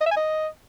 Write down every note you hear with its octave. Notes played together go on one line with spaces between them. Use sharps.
D#5
E5
G#5
D#5